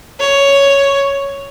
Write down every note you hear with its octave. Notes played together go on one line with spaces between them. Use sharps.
C#5